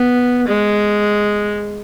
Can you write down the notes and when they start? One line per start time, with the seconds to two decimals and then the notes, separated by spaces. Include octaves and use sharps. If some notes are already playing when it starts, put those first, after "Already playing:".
Already playing: B3
0.48 G#3